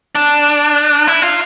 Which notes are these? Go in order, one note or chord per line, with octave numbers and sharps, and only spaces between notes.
D4
E4
F4